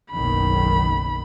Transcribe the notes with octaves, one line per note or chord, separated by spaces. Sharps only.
F#1 B1 D#3 B5